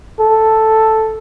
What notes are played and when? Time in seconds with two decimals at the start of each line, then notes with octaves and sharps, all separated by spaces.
0.20 A4